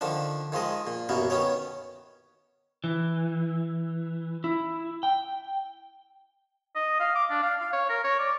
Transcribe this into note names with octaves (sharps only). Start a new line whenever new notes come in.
D3 D#3 F3 D4
D#3 F3 G#3 D#5
A#2
A1 F#2 B2 A#3 B3
D#3 B3 C#4 C#5
E3
E4
G5
D#5
F5
D6
D4
F5
F5
C#5
A#4
C#5
D5